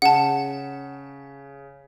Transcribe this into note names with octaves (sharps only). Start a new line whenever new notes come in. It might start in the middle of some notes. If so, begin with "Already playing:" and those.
C#3 F#5 A5